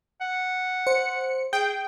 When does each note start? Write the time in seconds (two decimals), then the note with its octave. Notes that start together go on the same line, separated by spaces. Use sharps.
0.21 F#5
0.87 C5 C#7
1.53 G#4 G5